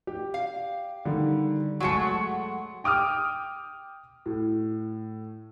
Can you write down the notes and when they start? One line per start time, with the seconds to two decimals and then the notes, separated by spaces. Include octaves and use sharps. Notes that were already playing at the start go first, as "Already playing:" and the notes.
0.07 G4
0.34 F5
1.05 D3 D#3 G3
1.80 F#3 G#3 A3 F#4 C#7
2.00 F#5
2.84 G5 D6 D#6 F6
4.26 A2